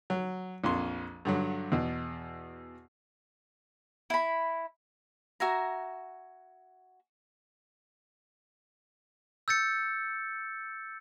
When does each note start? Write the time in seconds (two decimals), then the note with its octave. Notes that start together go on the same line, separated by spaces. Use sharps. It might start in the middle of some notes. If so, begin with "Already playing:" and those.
0.10 F#3
0.64 A#1 F2 C6
1.25 G2 D3 F#3
1.72 E2 B2
4.10 E4 B5
5.40 F#4 E5 G#5 A#5
9.48 E6 G6 A6 C#7